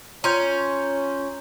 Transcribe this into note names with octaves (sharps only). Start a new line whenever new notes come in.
C#4 F4 C#5 A#5 C6 G6